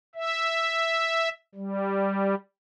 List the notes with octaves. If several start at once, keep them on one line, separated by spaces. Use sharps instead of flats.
E5
G3